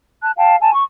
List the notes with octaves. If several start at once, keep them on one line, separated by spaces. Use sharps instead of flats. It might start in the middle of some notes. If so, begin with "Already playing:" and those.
A5 F#6
F5 G5 A5
G#5 A5
C#6